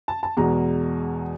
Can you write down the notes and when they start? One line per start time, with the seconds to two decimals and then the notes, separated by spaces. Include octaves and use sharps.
0.08 A5
0.23 A5
0.37 E2 B2 G#3 A#5